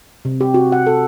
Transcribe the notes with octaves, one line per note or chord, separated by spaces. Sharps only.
C3
G4
F#4
F#5
A4